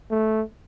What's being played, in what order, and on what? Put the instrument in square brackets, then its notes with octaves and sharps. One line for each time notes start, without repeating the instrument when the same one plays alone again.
[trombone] A3